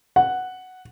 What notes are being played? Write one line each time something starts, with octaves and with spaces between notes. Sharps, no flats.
F#5